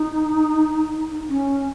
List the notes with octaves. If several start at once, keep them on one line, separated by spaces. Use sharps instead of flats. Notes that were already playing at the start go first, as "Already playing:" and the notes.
Already playing: D#4
C#4